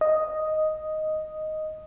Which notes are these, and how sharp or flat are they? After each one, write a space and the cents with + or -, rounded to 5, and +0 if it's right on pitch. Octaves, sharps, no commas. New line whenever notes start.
D#5 +0